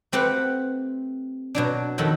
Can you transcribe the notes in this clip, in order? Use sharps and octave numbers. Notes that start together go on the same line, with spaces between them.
A3 C4 G4 B4 F#5
B2 F#3 D4
F2 D#3 F#3 A4 B5